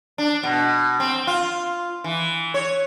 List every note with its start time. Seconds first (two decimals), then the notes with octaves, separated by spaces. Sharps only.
0.18 D4
0.43 B2
1.00 C4
1.27 F4
2.04 E3
2.54 C#5